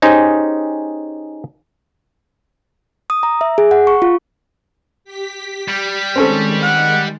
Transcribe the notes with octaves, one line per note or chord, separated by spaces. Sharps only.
C#4 D#4 G4 G#4 C5
D#6
A#5
E5
G#4
F#5
C#6
F4
G4 B6
G3
D#3 G#3 C4 C#4 A4
F#5